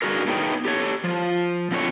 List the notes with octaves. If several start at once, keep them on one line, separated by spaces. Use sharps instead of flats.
G2 F#4 G#4 A#4
A3 B3 D#4 G#4 C#5 G5
G4 A4 C#5
F3
F2 B2 D3 D4 C#5